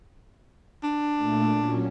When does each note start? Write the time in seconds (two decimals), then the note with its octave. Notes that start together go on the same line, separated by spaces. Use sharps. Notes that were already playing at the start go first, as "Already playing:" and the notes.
0.83 D4
1.17 A#2 A3
1.57 A#2 F#3 C#4